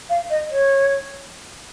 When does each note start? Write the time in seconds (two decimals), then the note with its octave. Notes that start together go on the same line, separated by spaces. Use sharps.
0.10 F5
0.30 D#5
0.50 C#5